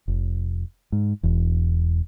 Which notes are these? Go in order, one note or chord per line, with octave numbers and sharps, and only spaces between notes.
F1
G#2
E1 E2